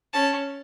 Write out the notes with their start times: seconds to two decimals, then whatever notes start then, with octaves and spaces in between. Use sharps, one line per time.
0.13 C#4 A5